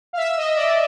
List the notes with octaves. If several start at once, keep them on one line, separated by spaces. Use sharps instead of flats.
F5
E5
D#5
D5